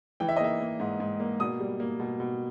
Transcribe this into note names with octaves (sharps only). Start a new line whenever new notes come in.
E3 G5
E5
D#5
A#3 E5
A#3
G#2
G#2
A#3
B2 D#6
G3
A#3
B2
B2